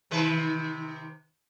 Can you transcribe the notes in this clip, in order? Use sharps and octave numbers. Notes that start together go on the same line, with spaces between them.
C3 D#3 B4